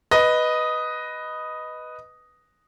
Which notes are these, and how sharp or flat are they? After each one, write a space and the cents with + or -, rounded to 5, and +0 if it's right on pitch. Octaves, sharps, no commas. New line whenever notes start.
B4 +0 D#5 +0